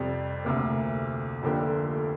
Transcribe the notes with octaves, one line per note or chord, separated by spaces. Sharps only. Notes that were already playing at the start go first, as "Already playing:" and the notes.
Already playing: F2 C3 G3
D2 C3 A#3
F1 F2 D3 A#3 G4